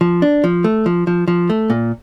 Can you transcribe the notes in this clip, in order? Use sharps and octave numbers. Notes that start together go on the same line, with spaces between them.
F3
D4
F3
A3
F3
F3
F3
A3
A#2